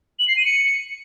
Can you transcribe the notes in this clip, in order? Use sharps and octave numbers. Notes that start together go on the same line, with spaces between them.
F#7
C7
D#7
C#7